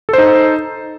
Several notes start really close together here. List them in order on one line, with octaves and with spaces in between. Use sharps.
A4 C5 D#4